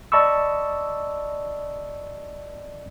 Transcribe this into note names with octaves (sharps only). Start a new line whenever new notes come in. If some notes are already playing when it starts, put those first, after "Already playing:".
D5 D#5 A5 B5 C#6 E6